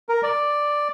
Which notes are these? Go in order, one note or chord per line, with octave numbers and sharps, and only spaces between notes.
A#4
D5